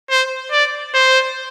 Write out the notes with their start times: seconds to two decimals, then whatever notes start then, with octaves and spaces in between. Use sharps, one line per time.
0.10 C5
0.52 D5
0.94 C5